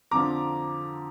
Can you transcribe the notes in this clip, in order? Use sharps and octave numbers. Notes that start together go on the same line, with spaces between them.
F2 D3 F3 A#5 D6